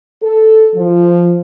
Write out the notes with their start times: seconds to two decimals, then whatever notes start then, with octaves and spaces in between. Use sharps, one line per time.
0.22 A4
0.75 F3